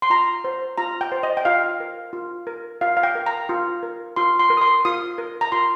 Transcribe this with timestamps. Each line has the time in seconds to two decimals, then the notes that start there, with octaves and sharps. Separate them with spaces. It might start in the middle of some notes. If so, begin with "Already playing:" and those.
0.02 C6
0.10 F4 A#5
0.44 C5
0.78 F4 A#5
1.01 G5
1.12 C5
1.23 D#5
1.37 G5
1.45 F4 F5
1.80 A#4
2.13 F4
2.47 A#4
2.81 F4 F5
2.97 F5
3.03 G5
3.15 A#4
3.26 A#5
3.49 F4
3.83 A#4
4.16 F4 C6
4.39 C6
4.50 A#4
4.57 D#6
4.61 C6
4.85 F4 D#6
5.18 A#4
5.41 A#5
5.52 F4 C6